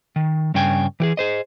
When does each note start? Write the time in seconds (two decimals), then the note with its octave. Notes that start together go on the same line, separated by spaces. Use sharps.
0.16 D#3
0.54 G2 C#3 G5 G#5
1.00 E3 G4 G#4
1.17 G#4 C5 D#5